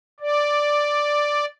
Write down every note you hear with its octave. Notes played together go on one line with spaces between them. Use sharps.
D5